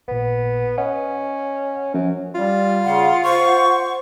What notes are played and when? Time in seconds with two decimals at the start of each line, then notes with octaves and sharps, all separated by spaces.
0.08 A1 A#2 B3
0.78 C#4 D#5 F#5
1.94 F#2 F3 C#4
2.35 G3 F4
2.85 C#3 F#5 C6
3.23 C5 C#6